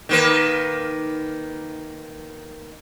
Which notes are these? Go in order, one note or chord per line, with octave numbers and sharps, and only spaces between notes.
D#3 A#3 B4